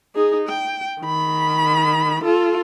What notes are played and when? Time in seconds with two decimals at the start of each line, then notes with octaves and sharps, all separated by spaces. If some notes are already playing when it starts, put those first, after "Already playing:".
0.15 D#4 G#4
0.49 G5
1.01 D#3 B5
2.24 F4 A4